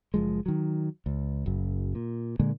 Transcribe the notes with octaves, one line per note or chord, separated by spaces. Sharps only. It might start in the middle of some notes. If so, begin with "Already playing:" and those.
F#1 F3 G#3
D#3 F#3
C#2
F#1 F#2
A#2
A#2 D3 G#3 A#3